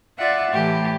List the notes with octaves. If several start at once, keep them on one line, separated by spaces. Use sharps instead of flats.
F4 D5 E5 F#5
A2 E3 G4